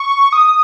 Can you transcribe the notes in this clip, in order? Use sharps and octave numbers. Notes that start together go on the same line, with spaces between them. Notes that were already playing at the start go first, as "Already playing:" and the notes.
Already playing: C#6
D#6